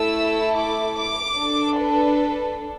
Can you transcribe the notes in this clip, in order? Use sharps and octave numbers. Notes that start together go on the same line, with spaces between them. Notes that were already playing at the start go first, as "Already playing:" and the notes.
Already playing: A3 E4 A4 E6
D6
D6
D4 A4
B4